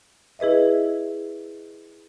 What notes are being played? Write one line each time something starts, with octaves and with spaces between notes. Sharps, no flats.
E4 G#4 B4 D#5 E5